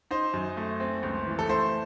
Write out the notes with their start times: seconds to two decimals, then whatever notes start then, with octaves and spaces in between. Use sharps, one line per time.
0.11 D#4 C5
0.34 F#2
0.57 A3
0.80 C4
1.03 C#2
1.27 E3
1.39 A4
1.49 A3 C5